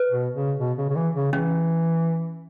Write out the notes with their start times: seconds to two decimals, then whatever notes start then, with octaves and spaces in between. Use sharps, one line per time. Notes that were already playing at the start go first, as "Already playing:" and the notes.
Already playing: B4
0.10 B2
0.34 C#3
0.59 B2
0.78 C#3
0.90 C#3
0.95 E3
1.15 C#3
1.32 E3 C#4